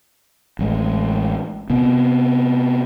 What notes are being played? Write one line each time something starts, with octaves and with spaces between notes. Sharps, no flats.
A1 G#3
C3 B3